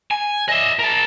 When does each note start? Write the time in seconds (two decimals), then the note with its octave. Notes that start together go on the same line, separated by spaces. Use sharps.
0.11 G#5
0.49 D#5 E5
0.79 A#4 A5